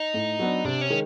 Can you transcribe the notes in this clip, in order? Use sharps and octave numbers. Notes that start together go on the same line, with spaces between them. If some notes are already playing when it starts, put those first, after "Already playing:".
Already playing: D#4
A2
F#3 B3 D4
C3 D4
C#4
D#3 G#3